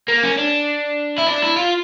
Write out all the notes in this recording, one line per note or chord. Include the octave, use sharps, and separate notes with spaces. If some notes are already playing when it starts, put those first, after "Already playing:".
A#3
C#4
D4
E4
D4
E4
F4